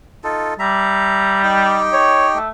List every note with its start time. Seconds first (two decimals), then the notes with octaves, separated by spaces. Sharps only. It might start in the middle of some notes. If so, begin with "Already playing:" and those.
0.24 D#4 F4 A4
0.59 G3 E5 A#5
1.43 D#4 G4 G5
1.93 C#5
2.36 A3